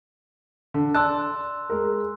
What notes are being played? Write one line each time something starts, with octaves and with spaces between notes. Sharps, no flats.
D3
D5 A5 C6 E6 F#6
G#3 A#4